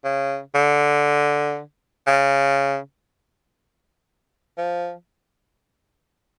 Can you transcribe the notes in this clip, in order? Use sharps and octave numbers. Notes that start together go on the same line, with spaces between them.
C#3
D3
C#3
F3